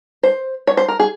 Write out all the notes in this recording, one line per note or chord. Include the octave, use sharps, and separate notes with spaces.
C5
C#5
C5
A#4
G#4